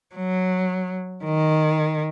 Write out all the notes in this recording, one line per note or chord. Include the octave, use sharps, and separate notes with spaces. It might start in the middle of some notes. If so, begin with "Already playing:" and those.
F#3
D#3